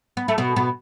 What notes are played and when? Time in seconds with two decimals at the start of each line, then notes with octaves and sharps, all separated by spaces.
0.17 B3
0.28 A3
0.38 B2 B3
0.56 B2 B3